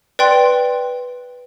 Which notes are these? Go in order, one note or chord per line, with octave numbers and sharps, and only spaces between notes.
B4 D5 G5 C6